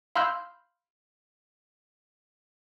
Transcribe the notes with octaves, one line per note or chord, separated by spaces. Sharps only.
F5 B5 C6 E6 F6 G6